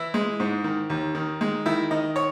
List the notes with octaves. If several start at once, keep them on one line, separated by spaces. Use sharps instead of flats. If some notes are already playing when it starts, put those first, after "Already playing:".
Already playing: E3 E4
G#3
G#2
D#3
D#2
D#3
G#3
D#3 E4
D#3 D#5
C#5